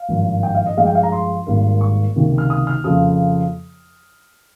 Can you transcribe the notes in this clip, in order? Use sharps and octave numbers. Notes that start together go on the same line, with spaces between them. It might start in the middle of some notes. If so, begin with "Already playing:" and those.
Already playing: F5
G#1 G2 F3 A#3
G5
F5
D#5
G2 F3 G#3 F5
G5
F5
A#5
C6
G#1 G#2 G3 A#3
C#6
C#2 C3 D#3 A#3
F6
D#6
F6
F2 C#3 F3 A#3 D#6